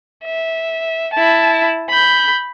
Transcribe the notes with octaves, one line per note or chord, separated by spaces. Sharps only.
E5
E4 A5
B5 G6